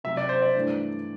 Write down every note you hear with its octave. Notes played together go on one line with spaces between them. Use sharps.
C3 F#3 C4 E5
D5
C5
D5
G2 E3 A3 D4